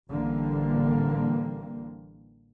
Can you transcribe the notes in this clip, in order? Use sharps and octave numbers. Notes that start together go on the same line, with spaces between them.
A1 D3 E3 G3 A#3 C4